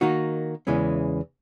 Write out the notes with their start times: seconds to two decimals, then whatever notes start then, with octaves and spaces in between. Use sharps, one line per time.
0.01 D#3 A#3 D#4 F#4
0.67 E2 C#3 E3 G#3 C#4